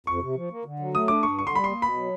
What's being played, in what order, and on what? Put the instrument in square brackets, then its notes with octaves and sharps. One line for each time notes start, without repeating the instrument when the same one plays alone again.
[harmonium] F2 [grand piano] C#6
[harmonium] C3
F3
A#3
D3
F#3
[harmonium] A3 [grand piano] D#6
[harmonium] D4 [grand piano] D6
[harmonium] G2 [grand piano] C#6
[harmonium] D3 [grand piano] C#6
[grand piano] C6
[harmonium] G3 [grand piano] B5
[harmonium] A#3 [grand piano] C6
[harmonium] B2 [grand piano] B5
[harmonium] F#3